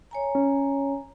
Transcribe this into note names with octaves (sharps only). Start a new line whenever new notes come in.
C#5 G#5 A#5
C#4